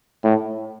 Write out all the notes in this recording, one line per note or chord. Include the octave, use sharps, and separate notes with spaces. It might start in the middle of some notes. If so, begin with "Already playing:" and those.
A2